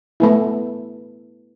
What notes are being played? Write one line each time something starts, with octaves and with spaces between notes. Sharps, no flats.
A3 B3 E4